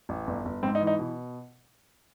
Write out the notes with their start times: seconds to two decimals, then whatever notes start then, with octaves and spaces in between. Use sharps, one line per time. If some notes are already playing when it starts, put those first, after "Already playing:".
0.09 A1
0.27 G1
0.45 G1
0.63 G#2 C4
0.75 D#4
0.81 E3
0.87 D#4
0.99 B2